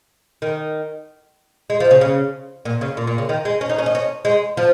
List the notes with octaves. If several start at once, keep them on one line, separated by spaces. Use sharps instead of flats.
D#3
G#3
F3
C#3
C#3
A#2
C#3
A#2
A#2
C#3
D#3
G#3
C#4
D#4
C#4
D#4
C#4
G#3
F3